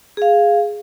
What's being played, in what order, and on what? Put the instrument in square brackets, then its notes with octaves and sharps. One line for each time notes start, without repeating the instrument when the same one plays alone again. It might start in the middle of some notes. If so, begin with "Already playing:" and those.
[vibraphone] G#4 F5